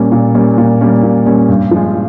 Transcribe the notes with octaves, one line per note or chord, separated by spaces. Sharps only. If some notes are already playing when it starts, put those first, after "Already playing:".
Already playing: A#2 G3 A#3 C#4
A#2
G3 A#3 C#4
A#2
G3 A#3 C#4
A#2
G3 A#3 C#4
G2
F3 G#3